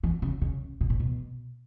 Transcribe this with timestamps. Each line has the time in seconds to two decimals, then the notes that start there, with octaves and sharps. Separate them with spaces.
0.03 E3
0.22 C#3
0.42 C#3
0.81 B2
0.90 A2
1.00 B2